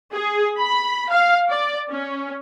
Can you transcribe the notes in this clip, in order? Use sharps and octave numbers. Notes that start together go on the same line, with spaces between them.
G#4
B5
F5
D5
C#4